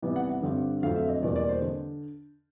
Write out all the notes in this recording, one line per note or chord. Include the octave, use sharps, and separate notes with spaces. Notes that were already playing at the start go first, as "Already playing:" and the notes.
C3 E3 G3 B3 E4
F#5
F#5
G2 D3 G3 C4
F2 D3 F#3 A3 C4 F5
E5
D#5
E2 B2 G3 A#3 D5
D5
C5
D3